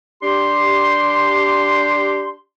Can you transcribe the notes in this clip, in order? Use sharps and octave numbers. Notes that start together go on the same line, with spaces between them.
D4 G4 C6